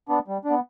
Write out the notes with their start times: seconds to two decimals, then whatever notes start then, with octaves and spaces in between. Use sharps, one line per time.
0.09 B3 D4
0.28 G3
0.45 D4
0.50 B3